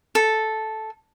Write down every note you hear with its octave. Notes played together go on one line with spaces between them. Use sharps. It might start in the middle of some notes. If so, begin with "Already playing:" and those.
A4